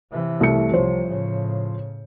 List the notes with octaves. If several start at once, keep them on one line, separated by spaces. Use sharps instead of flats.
C3 E3
C2 A3 C#7
C2 C3 F3 C5 C#5
A2 C#3